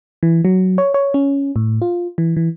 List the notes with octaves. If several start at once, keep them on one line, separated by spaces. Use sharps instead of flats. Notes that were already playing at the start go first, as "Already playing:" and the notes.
E3
F#3
C#5
C#5
C#4
A2
F4
E3
E3